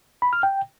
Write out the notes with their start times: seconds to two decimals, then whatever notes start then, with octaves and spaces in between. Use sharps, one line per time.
0.22 B5
0.33 F6
0.43 G5